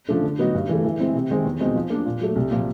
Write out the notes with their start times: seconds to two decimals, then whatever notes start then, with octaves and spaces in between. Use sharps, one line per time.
0.09 C#3 F3 A3 D4
0.24 D3
0.38 F#3 B3 D#4 F#4
0.54 G2
0.69 E3 A3
0.84 E3
0.99 G#3 C4 E4
1.15 C3
1.30 D#3 G#3 C4
1.45 E2
1.60 B2 G#3 C4 D#4
1.75 F3
1.90 A#3 D4
2.06 A#2
2.21 F#3 A3
2.36 C2
2.51 A#2 F3